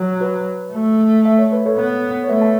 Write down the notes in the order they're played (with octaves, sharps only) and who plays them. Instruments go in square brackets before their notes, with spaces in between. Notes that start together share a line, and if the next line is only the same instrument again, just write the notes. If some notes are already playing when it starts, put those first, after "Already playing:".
Already playing: [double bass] F#3
[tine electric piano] F#4 B4
[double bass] A3
[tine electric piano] E5
C#5
B4
A4 C#5
[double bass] B3
[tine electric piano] C#5
[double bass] A3 [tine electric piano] B4 E5
[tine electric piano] E5 A5